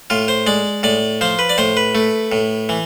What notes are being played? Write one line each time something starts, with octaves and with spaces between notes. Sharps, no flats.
A2 F4
C5
G#3 D5
A2 D5
F3 C5
B4
D5
A2 C5
B4
A3
A2
E3